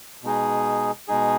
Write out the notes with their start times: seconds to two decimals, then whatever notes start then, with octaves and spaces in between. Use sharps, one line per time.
0.23 B2 G#3 D#4 G#4
1.08 B2 G#3 D#4 G#4